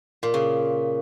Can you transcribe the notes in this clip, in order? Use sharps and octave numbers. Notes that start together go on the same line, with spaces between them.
A#2
C#3